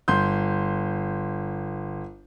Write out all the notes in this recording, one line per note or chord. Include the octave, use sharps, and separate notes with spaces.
G1 C6 G6